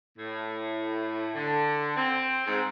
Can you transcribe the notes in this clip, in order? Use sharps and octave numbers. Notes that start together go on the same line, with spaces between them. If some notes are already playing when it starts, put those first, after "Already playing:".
A2
D3
C4
G#2